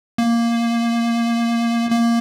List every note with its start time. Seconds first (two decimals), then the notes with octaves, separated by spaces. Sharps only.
0.18 A#3
1.91 A#3